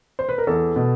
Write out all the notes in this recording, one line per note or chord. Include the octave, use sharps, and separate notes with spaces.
C5
B4
A#4
E2 A4
B2